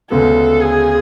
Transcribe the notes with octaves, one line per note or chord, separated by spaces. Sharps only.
D2 C#3 G#3 B3 A4
G#4